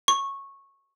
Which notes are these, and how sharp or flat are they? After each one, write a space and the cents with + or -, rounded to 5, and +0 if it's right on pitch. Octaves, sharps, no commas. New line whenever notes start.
C#6 -15